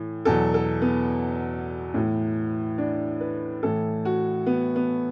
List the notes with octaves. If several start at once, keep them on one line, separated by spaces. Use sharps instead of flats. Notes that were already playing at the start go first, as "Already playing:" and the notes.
Already playing: A2 E3
E2 B2 F#3 A4
A4
B3
A2 E3
D4
B4
A2 E3 A4
F#4
B3
B3